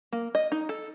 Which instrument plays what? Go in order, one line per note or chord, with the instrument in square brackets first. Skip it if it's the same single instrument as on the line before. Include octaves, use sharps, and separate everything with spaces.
[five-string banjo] A#3
D#5
D#4
A4